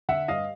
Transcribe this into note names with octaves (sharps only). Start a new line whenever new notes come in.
D3 E5 F#5
G2 D#5 F5